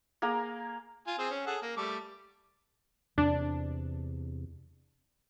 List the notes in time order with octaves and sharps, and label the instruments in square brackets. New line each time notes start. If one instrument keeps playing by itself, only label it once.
[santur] A#3 G#4 G#5 A#5
[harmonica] F4 G#5
C4 G#4 C5
C#4
G#4 A4 F#5
A#3
G3 A3 D6
[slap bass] E2 C3 [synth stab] D4